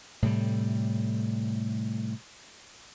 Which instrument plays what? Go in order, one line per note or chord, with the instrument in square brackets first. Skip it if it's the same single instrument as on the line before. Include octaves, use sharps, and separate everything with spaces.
[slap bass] A2 C3 G3